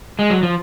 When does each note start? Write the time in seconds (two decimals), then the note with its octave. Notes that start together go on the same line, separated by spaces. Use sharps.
0.19 G#3
0.30 F#3
0.43 F3